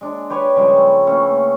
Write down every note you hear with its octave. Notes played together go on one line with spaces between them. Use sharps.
G#3 D4
G4 B4 C#5 G#5
C#3 F3 G3 G#3
A3
E3 A3 A#3 C#4